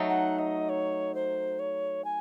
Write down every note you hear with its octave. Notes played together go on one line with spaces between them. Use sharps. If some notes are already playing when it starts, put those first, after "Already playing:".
Already playing: F#3 A3 D#4 A4
F#5
D#5
C#5
C5
C#5
G#5